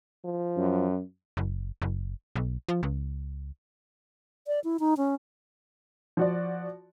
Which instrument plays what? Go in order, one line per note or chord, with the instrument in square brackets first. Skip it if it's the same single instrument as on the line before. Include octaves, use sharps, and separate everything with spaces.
[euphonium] F3
[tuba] F#2
[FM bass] F#1
F#1
B1
F3
C#2
[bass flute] D5
E4
D#4
C#4
[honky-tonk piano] F3 F#4 D5